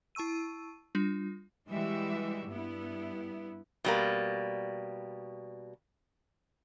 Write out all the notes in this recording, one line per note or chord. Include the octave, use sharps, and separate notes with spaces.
E4 A5 C#6 E6 D#7
G3 D4 F4
E3 G3 G#3 F#4 G4 E5
G2 B3 E4
B2 G3 A#3